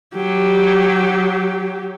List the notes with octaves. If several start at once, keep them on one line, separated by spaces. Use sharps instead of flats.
F#3 G4